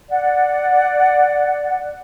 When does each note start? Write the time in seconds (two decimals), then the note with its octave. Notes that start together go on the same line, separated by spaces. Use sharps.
0.09 D5 F#5